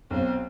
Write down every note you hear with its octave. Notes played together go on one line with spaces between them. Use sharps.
B1 B2 C4